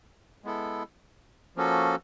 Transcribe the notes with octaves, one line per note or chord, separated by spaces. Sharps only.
G#3 B3 E4 A4
F3 A#3 C#4 F#4 A4